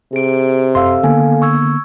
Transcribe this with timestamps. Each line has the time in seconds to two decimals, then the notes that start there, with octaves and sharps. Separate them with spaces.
0.13 C3 G#4 D7
0.75 F#2 A4 F5 C6 E6
1.03 D3 A#3 B3 A4 F5 G#5
1.42 C#6 E6 G#6